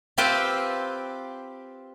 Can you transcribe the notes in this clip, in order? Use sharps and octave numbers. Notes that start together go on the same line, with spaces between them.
C4 F4 G4 B4 E5 G5